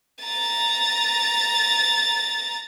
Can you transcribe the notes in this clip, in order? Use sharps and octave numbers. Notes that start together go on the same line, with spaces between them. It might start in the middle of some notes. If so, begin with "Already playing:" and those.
A#5 A6